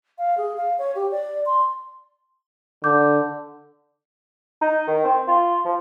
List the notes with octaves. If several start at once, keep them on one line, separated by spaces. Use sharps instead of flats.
F5
G#4
F5
C#5
G4
D5
C6
D3 D6 G6
D#4
D#3
C4
F4
F3